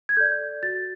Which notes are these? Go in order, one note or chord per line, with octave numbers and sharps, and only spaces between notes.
G#6
A4 D5 G6
F#4 A6